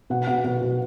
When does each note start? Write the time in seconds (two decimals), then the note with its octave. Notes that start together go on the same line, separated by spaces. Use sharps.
0.10 B2 F#5
0.27 B2 F#5
0.44 B2 F#5
0.62 B2